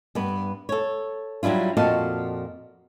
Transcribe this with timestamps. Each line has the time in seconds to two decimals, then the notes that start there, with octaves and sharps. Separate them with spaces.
0.15 G2 B3
0.69 A4 C#5
1.43 F#3 G3 D4 E4 F4
1.77 F2 A#2 F#4 D#5 F5 A5